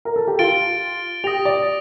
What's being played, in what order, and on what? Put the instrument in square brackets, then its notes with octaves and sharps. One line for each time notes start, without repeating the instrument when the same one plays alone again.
[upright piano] A#4
A4
G4
[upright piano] F4 [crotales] A6 D7 G7
[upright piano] G4 [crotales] D#6 A#6 D7 F7
[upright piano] D5